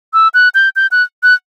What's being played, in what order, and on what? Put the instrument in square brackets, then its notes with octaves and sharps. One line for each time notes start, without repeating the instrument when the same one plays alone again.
[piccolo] E6
F#6
G6
G6
F#6
F#6